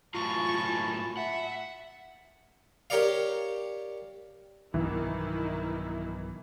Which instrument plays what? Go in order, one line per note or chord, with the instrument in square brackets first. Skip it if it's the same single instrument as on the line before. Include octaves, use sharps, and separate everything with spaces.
[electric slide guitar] A2 F#3 F4 [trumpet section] G#5 A5 B5 [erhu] C#6
[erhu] E5 [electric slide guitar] F#5
[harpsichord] G4 A#4 C#5 D5 F5
[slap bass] B1 G2 B2 [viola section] D#3 E4 [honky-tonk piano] E3